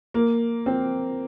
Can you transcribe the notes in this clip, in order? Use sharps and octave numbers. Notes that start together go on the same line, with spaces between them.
A#3
C4